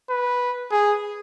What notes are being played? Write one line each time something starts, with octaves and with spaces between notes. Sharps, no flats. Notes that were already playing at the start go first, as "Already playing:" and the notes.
B4
G#4